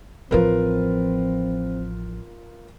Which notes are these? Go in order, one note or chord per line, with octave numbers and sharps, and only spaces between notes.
A1 F3 C4 F4 A#4 B4